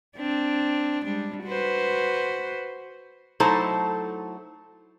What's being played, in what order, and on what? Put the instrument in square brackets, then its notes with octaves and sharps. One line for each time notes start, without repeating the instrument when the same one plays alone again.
[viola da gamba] C4 D4
G3 G#3 D4
F#4 B4 C5
[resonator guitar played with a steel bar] F#3 A3 D#4 E4 A4 C5